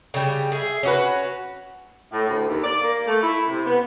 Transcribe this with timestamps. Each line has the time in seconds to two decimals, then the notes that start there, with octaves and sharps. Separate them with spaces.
0.14 C#3 G3
0.52 G#4 E5
0.83 C#4 F#4 B4
2.12 A2
2.28 D2
2.47 D#2
2.63 D5
2.81 A#3
3.05 A3
3.22 E4
3.47 C3
3.65 B3